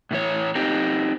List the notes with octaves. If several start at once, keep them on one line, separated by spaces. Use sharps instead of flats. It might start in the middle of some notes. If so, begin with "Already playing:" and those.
A2 E3 C#5
C4 D#4 G4